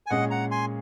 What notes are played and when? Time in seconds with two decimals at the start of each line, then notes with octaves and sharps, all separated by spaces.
0.06 G#5
0.10 A#2 G#3 C#4 G#4 D#5 F#5
0.30 F#5 A#5
0.51 G#5 C6